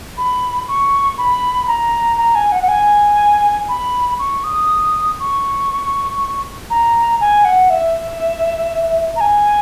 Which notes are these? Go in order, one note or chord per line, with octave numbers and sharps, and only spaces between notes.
B5
C#6
B5
A#5
A#5
G#5
F#5
F#5
G#5
B5
C#6
D#6
C#6
A#5
G#5
F#5
E5
A#5
G#5